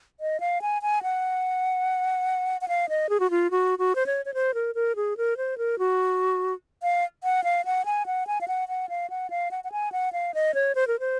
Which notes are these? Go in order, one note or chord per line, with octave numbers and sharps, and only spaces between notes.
D#5
F5
G#5
G#5
F#5
F#5
F5
D#5
G#4
F#4
F4
F#4
F#4
C5
C#5
C#5
C5
A#4
A#4
G#4
A#4
C5
A#4
F#4
F5
F#5
F5
F#5
G#5
F#5
G#5
F5
F#5
F#5
F5
F#5
F5
F#5
F#5
G#5
F#5
F5
D#5
C#5
C5
A#4
C5